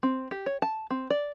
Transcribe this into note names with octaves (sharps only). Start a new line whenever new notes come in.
C4
G4
C#5
A5
C4
D5